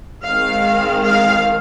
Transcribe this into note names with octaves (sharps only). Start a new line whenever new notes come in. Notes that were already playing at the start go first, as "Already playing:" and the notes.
D#3 G#3 C4 F5
F5